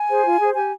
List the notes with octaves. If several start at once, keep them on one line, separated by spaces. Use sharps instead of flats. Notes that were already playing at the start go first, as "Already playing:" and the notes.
Already playing: G#5
G#4 C5
F4
G#4 C5
G4 G#5